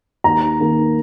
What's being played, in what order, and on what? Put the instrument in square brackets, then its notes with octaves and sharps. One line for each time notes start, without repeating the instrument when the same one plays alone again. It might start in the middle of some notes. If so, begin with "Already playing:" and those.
[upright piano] D#2 A#5
D#3 A#3